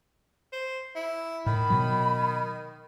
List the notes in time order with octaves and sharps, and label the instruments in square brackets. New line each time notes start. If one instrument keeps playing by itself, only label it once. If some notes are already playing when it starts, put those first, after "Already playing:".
[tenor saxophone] C5
E4
[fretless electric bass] A2 [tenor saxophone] D#3 [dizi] B5
[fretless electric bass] B2 F#3